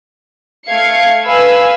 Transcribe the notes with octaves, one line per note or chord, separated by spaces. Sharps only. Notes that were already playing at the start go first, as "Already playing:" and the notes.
A3 F5 G#6 C#7
B4 F5 G#5 E6